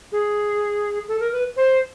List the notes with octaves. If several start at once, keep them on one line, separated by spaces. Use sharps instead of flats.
G#4
A4
A#4
B4
C5